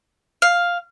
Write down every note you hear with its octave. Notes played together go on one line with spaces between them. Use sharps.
F5